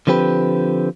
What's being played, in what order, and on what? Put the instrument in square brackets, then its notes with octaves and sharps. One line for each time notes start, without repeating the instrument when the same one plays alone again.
[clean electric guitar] D3 F3 C4 G4 B4